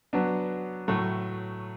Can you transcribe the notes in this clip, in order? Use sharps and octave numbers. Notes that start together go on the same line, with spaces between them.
F#3 B3 D4
A2 F#3 A3